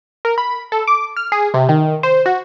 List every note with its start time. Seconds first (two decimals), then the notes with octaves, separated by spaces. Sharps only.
0.25 A#4
0.38 B5
0.72 A4
0.87 D6
1.17 F6
1.32 G#4
1.54 C3
1.69 D#3
2.03 C5
2.26 F#4